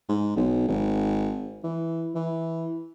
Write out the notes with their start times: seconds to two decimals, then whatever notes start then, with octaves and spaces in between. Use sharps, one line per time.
0.09 G#2
0.36 B1
0.68 G#1
1.64 E3
2.15 E3